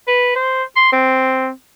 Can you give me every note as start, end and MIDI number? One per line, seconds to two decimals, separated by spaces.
0.08 0.32 71
0.36 0.63 72
0.76 0.89 84
0.92 1.50 60